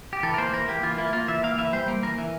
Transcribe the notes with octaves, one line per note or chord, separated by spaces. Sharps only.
G4
E3 A4
A#4
A#3 C5
E3 A#4
A#3 G4
E3 F4
A#3 E4
A#3 F4
E3 E5
A#3 F5
E3 E5
G3 C5
A#3
E3 A#4
E3